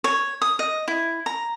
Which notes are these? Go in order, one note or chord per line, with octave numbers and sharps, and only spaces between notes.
C#5
D#6
D#5
E4
A#5